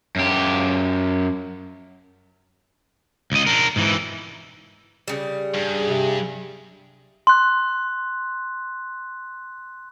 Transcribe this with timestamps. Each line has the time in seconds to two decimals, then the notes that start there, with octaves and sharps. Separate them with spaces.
0.16 F#2 G4
3.32 C#2 D#5
3.47 D4 A#4
3.76 G#2 E3
5.08 C#3 G3
5.54 G2 G#4
5.86 C3
7.27 C6 F#6